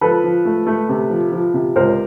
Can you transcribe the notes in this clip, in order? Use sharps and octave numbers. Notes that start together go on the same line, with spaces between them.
F3 A4 B4
F3
A3
A3
C3
F3
F3
C3
C#2 A#4 C5